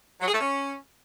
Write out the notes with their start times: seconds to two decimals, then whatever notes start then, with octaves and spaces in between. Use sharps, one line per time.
0.21 F#3
0.27 G#4
0.34 A3
0.40 C#4